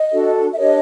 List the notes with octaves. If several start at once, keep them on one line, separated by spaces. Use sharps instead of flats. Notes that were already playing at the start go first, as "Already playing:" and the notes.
Already playing: D#5
D4 F#4 A4
E5
D4 G4 A#4 C#5 D#5